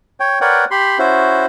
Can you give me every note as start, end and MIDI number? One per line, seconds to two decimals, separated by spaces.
0.20 0.39 73
0.20 0.39 79
0.41 0.65 70
0.41 0.65 71
0.41 0.65 73
0.41 0.65 74
0.41 0.65 78
0.41 0.65 79
0.71 0.98 67
0.71 0.98 83
0.71 0.98 84
0.99 1.46 61
0.99 1.46 64
0.99 1.46 66
0.99 1.46 72